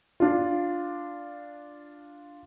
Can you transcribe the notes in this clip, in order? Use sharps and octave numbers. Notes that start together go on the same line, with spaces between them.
D4 F4